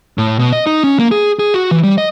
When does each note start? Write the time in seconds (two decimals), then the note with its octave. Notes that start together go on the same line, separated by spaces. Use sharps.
0.18 A2
0.39 B2
0.52 D#5
0.66 D#4
0.84 C#4
0.99 A#3
1.11 G#4
1.39 G#4
1.54 F#4
1.71 E3
1.83 G3
1.98 D#5